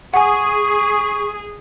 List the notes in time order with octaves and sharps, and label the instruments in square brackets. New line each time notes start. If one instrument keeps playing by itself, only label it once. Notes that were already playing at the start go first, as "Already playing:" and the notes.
[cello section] G#4 [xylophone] F#5 G#5 [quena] C#6